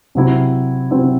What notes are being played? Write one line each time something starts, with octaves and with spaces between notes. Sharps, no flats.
C3 F#3 C4 E4
C3 F#3 C4 E4